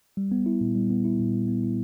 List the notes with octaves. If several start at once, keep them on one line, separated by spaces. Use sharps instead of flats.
G3
B3
E4
A#2
G3
B3
E4
A#2
G3
B3
E4